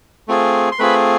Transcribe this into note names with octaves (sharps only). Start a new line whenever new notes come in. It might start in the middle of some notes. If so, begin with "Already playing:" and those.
A3 C4 F4 G#4
C6
A3 C4 F4 G#4 B4 B5